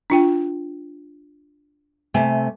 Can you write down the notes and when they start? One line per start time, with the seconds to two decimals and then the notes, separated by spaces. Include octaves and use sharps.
0.10 D4 F4 G5
2.14 C3 A3 G#5